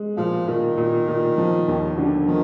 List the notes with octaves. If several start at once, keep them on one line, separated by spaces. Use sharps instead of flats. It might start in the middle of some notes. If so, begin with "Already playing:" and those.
Already playing: G#3
A#2 F3
A#2 D#3
A#2
A#2
F3
D#2
D3
D#3 F3